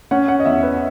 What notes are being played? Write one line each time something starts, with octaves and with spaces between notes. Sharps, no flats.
C#4 F#5
F#5
D#5
E2 E5
B4